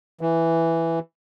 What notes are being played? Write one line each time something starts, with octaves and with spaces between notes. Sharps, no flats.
E3